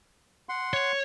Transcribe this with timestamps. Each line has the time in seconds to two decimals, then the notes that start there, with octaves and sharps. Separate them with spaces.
0.49 F#5 C6
0.73 C#5